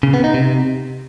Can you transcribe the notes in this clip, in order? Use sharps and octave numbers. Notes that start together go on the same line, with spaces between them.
C#3
B3
D#4
C3